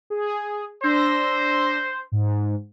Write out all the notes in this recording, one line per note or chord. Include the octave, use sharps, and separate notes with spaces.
G#4
D4 C5 E6 A#6
G#2